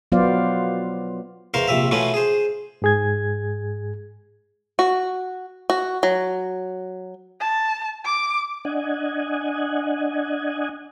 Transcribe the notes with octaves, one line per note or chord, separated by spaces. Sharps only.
F#3 B3 F4 C5 D5 F5
E2 A#4 C5 F5 C6 C#6
A#1 C3 E5 F5
B2 E3 A3 C#4 F4
G#4 C5
G#2 G#4 G#6
F#4
F#4
F#3
A5
D6
D4 D#5 F#5 G#5